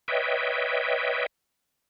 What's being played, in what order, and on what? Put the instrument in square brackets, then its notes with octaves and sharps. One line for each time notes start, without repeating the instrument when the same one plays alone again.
[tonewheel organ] B4 C#5 D#5 E5 G5